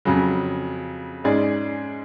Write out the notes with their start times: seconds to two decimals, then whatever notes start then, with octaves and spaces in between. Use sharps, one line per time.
0.05 F2 C#3 F#3
1.24 G#2 G#3 C#4 G#4 D5